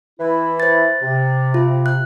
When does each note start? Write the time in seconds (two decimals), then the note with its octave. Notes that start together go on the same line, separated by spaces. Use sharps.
0.20 E3 E4
0.60 C5 A6
1.02 C3
1.54 F4
1.86 F#6